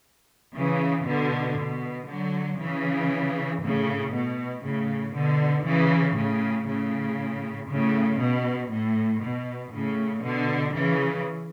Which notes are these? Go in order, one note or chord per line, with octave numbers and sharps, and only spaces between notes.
C#3 E3
B2 D3
B2
D3 F#3
C#3 E3
A2 C#3
B2
A2 C#3
B2 D3
C#3 E3
A2 C#3
A2 C#3
A2 C#3
B2
A2
B2
A2 C#3
B2 D3
C#3 E3